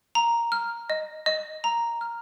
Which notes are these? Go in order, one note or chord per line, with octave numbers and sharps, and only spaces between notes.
A#5
F6
D#5
D#5
A#5
F6